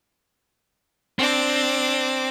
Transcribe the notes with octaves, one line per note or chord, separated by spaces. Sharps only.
C4 D4 D6